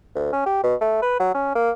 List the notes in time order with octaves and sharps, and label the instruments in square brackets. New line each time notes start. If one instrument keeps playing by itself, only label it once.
[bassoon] D2
C#4
G4
B2
A3
B4
F#3
C#4
A#3